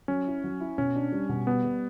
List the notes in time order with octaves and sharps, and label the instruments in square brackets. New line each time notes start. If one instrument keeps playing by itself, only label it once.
[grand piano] F#3 [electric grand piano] C#4
[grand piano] E4
F#3
E4
[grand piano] B2 [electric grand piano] C#4
[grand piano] D4
G3
B2
[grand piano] G3 [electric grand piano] B3
[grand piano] G3